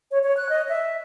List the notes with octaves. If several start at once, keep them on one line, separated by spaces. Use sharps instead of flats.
C#5
C#5
F#6
D#5
E5